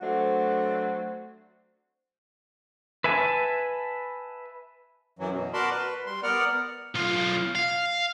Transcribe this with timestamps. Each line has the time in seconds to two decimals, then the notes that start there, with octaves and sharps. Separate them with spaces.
0.01 F#3 A3 C4 D4 F#4
3.04 B4 E5 G#5 A5
5.19 F#2 E3 F#3
5.32 B2
5.53 F#4 A#4 D5 A5 B5 C6
5.71 B4
6.06 G3 C6
6.23 B3 A#4 D5 F#5 F6
6.95 B1 F4
7.55 F5